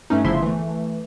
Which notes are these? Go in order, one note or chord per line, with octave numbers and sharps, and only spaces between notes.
G2 A3 C#4 D#4
G1 C#3 F3 E4 E5 C6
E3 A3